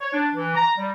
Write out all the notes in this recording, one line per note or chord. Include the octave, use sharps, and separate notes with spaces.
C#5
D4
E3
A#5
G3